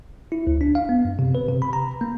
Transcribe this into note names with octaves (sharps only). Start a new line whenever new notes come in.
E4
D2
D4
F5
B3
F#2
C3
B4
C3
B5
A#5
A#3